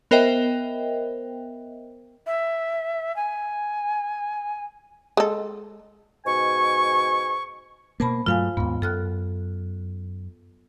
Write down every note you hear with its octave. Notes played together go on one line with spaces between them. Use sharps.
B3 A#4 C5 D#5 E5 G5
E5
G#5
G#3 A4
G#2 B2 G#5 C#6
B2 A#3 C5 A5 B5
G2 F#3 A3 F4 F5 G#5
D#2 G#2 B3
F#2 A4 F6 F#6